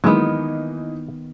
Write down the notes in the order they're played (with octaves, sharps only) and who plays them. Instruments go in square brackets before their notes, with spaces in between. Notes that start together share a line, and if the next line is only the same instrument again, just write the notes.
[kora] D#3 B3 [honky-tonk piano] E3 A#3 D#4 [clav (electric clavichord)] F#3 G#3